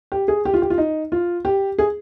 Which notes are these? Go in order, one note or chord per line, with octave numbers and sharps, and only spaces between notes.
G4
G#4
G4
F4
G4
F4
D#4
F4
G4
G#4